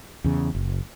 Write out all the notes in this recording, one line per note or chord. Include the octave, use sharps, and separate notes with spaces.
E2 C#3
F#1